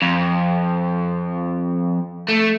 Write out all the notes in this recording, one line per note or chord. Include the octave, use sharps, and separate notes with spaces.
F2
A3